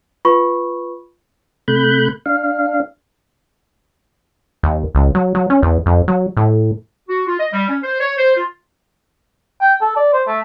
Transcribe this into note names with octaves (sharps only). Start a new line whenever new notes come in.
F4 B4 B5 C#6
C3 A3 B5 F#6 G6
D4 F5
D#2
C#2
F#3
F#3
C#4
E2
F2
F#3
A2
F#4
F4
D#5
G3
C#4
C5
C#5
C5
F4
G5
A4
D5
C5
A3